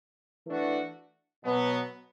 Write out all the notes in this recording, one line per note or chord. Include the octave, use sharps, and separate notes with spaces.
E3 A3 D4 F#4
B2 F#3 B3